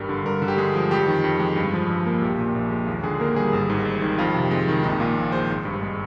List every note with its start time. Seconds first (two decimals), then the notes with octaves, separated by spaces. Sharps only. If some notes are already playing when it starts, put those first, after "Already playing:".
Already playing: G#1 G2 G3 A#4
0.09 D3
0.25 G2 A#4
0.42 D3
0.48 G4
0.58 G#3 G#4
0.75 F3
0.91 F2 G4
1.07 D#3
1.24 F2
1.40 G#3
1.56 G2
1.74 F3
1.89 G2
2.06 A#3
2.21 A#1 G4
2.38 A#2
2.55 A#1
2.71 G#3
2.87 D#2 F4
3.03 D3 G#4
3.20 A#3 A#4
3.36 G3 G#4
3.53 G#1
3.70 G#2
3.85 G#1
4.02 D#3
4.18 F2 F4
4.35 C3
4.51 G#3
4.68 D#3
4.83 A#1 D#4
5.00 A#2 F4
5.16 A#1
5.32 G#3 C5
5.50 G#1
5.65 G2
5.82 G#3